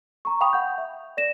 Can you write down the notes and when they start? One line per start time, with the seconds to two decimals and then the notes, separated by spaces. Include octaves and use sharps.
0.25 A#5 C#6
0.41 F5 G5 B5 C#6 D#6 F7
0.53 F#5 G6
0.78 E5
1.17 D5 A#6 E7